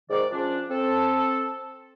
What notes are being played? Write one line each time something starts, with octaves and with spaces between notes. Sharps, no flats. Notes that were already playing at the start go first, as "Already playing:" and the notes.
G#2 D#3 D5
F3 C#4 D4
C4 A4